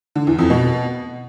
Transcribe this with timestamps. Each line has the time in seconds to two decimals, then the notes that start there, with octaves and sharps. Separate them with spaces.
0.15 D3
0.27 E2
0.39 F2
0.50 B2